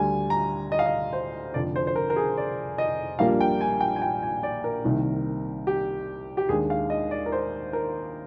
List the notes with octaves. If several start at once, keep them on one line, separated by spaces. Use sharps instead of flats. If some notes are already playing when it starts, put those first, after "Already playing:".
Already playing: D2 D3 G3 G#5
A#5
D#5
F5
D#5
C5
F1 F2 D3 F3 D5
C5
C5
A#4
A#4
G#4
D5
D#5
A#1 A#2 G3 A#3 D4 F5
G5
G#5
G5
G#5
G5
G#5
D5
A#4
C2 C3 D#3 A#3 D#4
G4
G4
D#2 D#3 G#3 D4 G#4
F5
D#5
D5
A#4
C5
A#4